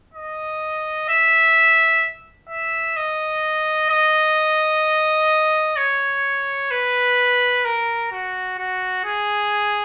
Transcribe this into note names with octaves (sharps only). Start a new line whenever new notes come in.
D#5
E5
E5
D#5
D#5
C#5
B4
A#4
F#4
F#4
G#4